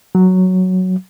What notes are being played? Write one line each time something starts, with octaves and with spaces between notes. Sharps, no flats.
F#3